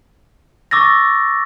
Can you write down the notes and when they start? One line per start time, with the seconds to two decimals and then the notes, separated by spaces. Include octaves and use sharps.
0.71 C#6 D6 E6 A6 A#6